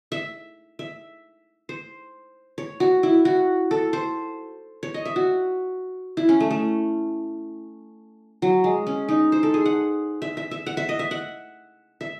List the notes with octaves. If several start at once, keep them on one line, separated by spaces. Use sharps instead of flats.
E5
E5
C5
C#5
F#4
E4
F#4
A4
C5
C#5
D#5
E5
F#4
E4
C#4
A3
A3
F#3
G#3
C#4
D#4
C5
A4
G#4
F#5
E5
E5
E5
F#5
E5
D#5
E5
F#5
E5